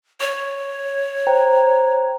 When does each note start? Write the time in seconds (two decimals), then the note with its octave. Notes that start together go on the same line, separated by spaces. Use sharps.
0.20 C#5 C#6
1.27 C5 G5 A#5